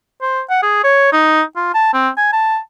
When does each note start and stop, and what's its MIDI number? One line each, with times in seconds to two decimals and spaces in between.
0.22 0.41 72
0.50 0.58 78
0.63 0.82 68
0.84 1.12 73
1.13 1.41 63
1.56 1.71 65
1.74 1.92 81
1.94 2.09 60
2.17 2.29 80
2.33 2.58 81